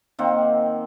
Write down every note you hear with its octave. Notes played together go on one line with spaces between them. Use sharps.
D#3 A#3 C4 F#5